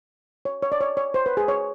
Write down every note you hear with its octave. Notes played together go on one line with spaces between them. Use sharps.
C#5
C#5
D5
C#5
C#5
C5
B4
G#4
C#5